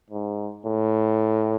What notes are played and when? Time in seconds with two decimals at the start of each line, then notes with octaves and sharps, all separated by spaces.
0.11 G#2
0.65 A2